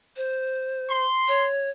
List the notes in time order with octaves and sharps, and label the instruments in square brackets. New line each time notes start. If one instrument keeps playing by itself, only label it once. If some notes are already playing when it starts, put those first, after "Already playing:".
[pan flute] C5
[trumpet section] C6
[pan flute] C#5